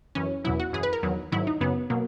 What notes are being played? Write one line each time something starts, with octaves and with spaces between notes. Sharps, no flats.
F#2 E3 C#4
E2 B2 F#3 E4
F#4
F#2 E3 G#4
B4
A#4
E2 D#3 F#3
G#2 D#3 F#3 E4
D#4
F#2 C#3 F#3 B3
B2 F#3 A#3